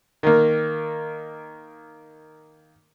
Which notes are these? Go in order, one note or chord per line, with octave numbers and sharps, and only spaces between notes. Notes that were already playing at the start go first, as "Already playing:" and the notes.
D#3 A#3